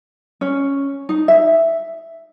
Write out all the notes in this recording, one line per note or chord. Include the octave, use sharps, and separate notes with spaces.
C#4
D#4
E5